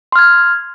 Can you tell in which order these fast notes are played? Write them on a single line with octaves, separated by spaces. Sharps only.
C6 F6 G#6